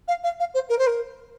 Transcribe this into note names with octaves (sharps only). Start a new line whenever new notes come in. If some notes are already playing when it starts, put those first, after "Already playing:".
F5
F5
F5
C5
A#4
C5
A#4